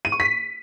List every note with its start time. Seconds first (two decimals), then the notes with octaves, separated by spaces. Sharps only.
0.05 D#7
0.12 C#6
0.20 B6